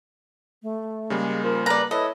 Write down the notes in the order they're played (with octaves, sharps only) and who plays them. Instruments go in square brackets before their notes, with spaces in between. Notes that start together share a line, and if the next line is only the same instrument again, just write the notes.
[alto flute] A3
[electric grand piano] C#3 G3 A#3 [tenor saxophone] G#3
[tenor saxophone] F3 [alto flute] A#4
[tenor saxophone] B4 [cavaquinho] D5 A#5
[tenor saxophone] E4 [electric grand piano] A4 B4 [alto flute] C#5 [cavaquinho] D#5